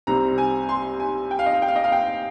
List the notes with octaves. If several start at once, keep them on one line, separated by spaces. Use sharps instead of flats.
C2 C3 G3 C4 A#5
G#5
C6
G#5
G5
F5
D#5
F5
G5
F5
D#5
F5
G5